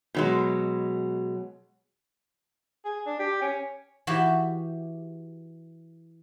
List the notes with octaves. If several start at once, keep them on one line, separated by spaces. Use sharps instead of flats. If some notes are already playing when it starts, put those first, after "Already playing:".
B2 F#3 G#3
G#4
D4
G4
C#4
E3 F#4 G4 E5